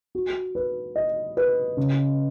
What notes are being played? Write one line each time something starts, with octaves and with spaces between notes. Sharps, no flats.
F#4
B4
D#5
B4
C#3